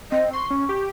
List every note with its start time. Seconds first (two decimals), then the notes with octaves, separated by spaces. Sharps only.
0.12 C4 D#5
0.33 C6 C#6
0.50 C#4
0.69 G4